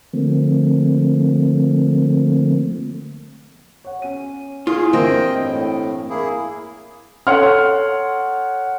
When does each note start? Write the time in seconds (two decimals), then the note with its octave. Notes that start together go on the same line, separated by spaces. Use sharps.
0.13 D3 F3 A3 A#3 C4
3.84 C#5 F#5
4.02 C#4 D#7
4.67 E4 F4 G#4
4.93 G2 E3 A#3 C4 D#5 G5
5.42 A2
6.10 A#3 E4 G#4
7.27 A4 C#5 F#5 C6 F6